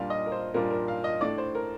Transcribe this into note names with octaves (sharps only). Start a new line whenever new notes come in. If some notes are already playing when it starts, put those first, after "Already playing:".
Already playing: A#2 G3 D4 F4 F5
D#5
A#4
C5
A#2 G3 D4 F4 A#4
A#4
F5
D#5
A2 A3 D4 D5
C5
A#4